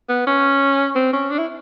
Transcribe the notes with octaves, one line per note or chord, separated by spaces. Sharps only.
B3
C#4
C4
C#4
D4
E4